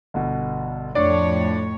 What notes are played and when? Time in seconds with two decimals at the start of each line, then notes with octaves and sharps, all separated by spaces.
0.14 G1 B2
0.95 F2 A2 D4 C#5 D5